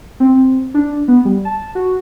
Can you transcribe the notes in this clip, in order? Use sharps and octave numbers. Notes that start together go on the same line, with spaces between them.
C4
D4
B3
G3
A5
F#4